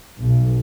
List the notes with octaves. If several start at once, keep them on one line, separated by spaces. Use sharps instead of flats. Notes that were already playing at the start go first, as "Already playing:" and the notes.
B1